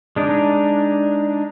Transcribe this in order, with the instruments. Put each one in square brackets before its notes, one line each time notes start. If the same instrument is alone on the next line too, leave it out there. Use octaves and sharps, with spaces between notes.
[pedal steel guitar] G#3 D4 D#4